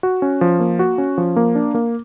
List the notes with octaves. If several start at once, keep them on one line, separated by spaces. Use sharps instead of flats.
F#4
C#4
F3
A#3
F#4
C#4
F3
A#3
D4
A#3